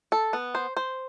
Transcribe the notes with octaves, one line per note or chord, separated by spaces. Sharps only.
A4
B3
C5
C5